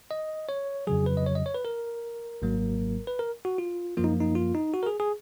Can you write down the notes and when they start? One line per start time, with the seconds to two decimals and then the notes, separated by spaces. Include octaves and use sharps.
0.11 D#5
0.49 C#5
0.87 F2 C#3 F#3 G#4
1.06 B4
1.17 D#5
1.26 C#5
1.35 D#5
1.46 C#5
1.54 B4
1.65 A#4
2.42 G#1 G#2 F#3 A#3
3.07 B4
3.19 A#4
3.45 F#4
3.58 F4
3.97 F#2 F3 A#3 F4
4.04 D#4
4.20 D#4
4.35 F4
4.55 D#4
4.74 F#4
4.83 A#4
4.87 G#4
5.00 G#4